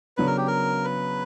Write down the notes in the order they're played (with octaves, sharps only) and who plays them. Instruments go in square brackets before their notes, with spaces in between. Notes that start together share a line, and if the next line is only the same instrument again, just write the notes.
[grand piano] C#3 F#3 B3 D4 [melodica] B4
[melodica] A#4
G4
A#4
B4